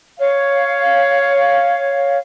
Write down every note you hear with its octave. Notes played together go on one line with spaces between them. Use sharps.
C#5 F5